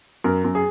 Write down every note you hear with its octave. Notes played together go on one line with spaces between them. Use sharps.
F#2 A#4
F#2
G#4